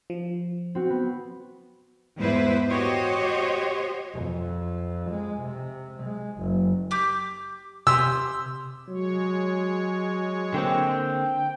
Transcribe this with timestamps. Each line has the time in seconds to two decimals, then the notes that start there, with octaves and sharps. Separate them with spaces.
0.10 F3
0.75 C4 F#4
0.90 B3
2.18 E2 G#2 E4 B4 C5
2.69 F#4 G4 C5 C#5 D#5
4.14 F2
5.10 G#3
5.41 C3
6.03 G#3
6.38 F#1
6.91 G4 D6 G6
7.87 C3 G4 C6 D#6 E6
8.88 F#3 G#3 C#5
10.54 D3 A#3 C4 G5